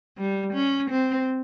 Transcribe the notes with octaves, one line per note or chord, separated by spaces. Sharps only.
G3
C#4
C4